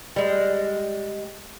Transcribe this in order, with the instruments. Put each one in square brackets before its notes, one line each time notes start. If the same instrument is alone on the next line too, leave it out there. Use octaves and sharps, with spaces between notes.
[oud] G3 G#3